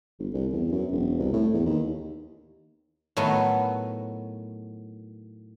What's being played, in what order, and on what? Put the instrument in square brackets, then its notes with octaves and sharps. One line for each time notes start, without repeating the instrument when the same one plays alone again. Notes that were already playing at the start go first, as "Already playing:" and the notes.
[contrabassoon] G1
C2
E2
F#2
E1
C2
A2
E2
D#2
[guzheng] A2 D#3 F#3 A3 B3